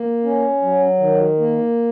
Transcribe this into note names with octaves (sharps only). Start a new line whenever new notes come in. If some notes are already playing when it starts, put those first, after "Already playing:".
Already playing: A#3
C#4
F#3
D#3
A#3